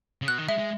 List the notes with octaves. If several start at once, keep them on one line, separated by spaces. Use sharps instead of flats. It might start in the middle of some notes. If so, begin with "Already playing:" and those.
C#3
B2 F#6
D#3
G#3 E5
G#3